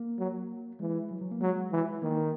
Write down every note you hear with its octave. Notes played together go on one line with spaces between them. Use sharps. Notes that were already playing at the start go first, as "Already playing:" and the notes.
Already playing: A#3
F#3
E3 G#3
F#3
F#3
A#3
F#3 G#3
E3
D#3 A#3